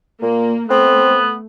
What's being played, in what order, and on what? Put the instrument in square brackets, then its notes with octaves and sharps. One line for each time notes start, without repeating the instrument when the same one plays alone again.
[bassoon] A#2 [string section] A#3
[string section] A3 [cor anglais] B3 [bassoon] C4